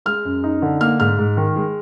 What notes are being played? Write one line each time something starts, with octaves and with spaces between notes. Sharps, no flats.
G#3 F6
F#2
D#4
D3
A#3 F6
G#2 F6
G#2
D#3
G#3